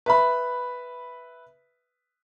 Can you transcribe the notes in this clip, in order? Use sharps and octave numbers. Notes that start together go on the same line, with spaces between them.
B4 E5 B5